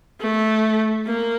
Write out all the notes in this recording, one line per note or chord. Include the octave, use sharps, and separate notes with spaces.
A3
A#3